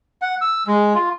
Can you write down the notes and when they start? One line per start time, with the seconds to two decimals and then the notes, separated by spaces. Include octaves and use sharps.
0.22 F#5
0.41 E6
0.67 G#3
0.94 F4